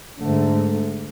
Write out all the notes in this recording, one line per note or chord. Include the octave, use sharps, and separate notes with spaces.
G#2 D3 A3